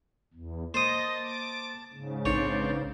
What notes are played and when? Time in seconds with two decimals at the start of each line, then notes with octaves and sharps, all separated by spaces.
0.34 E2
0.74 A#3 C5 D#5 A5 D#6
1.23 D6
1.92 G#2 C#3
2.25 A#1 C4 D4 D#4 B4 C#5